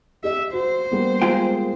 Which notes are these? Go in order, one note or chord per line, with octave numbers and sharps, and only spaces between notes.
G4 D#5 E5
F#4 C5
G3 A#3 B3
G#3 F4 G5